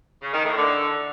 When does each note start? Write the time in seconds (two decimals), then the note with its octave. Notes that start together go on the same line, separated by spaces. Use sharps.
0.22 C#3
0.33 D#3
0.44 A2
0.55 D3